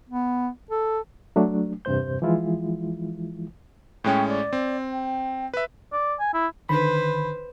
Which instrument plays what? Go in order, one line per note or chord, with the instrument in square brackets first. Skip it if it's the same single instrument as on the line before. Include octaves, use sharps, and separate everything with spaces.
[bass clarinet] B3
A4
[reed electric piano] F#3 A3 D4
E2 G2 C3 G3 C5 G6
E3 F3 G#3 E4 F4
[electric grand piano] A2 G#3 C#4 [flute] G5
[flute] D5
[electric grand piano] C4
[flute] G5
[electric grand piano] B4 E5
[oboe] D5
G#5
E4
[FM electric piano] D3 D#3 B5 [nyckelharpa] B4 C5